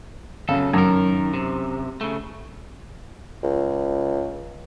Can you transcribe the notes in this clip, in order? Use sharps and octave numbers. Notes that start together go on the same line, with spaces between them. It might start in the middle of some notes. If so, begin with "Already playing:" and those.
F#2 C#3 A4
F#2 D#3 A#4
C3
C#3 A3
C#2